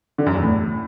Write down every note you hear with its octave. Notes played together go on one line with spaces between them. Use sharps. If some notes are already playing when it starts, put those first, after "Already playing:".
D3
F#2
E2
A2